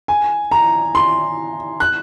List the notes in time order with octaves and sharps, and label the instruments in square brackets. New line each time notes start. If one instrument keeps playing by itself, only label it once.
[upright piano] G#5
A#5
C6
F#6